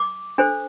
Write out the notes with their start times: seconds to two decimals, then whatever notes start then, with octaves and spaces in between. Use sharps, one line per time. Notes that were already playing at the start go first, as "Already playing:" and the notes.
Already playing: D6
0.38 D4 A4 C5